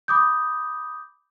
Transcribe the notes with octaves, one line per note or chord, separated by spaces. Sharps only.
B5 D6 D#6 G6